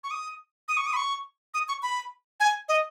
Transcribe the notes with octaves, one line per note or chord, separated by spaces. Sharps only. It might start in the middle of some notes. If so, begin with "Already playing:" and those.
C#6
D#6
D#6
C#6
D#6
B5
C#6
D#6
C#6
B5
G#5
D#5